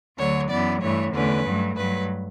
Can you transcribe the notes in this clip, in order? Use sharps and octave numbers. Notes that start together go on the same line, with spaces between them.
D2 D3 F#3 C#5
F#2 E3 B3 D5
G2 E3 A3 C#5
E2 D3 A3 C#4 B4
G2 F#3 A3
G2 F#3 A3 B4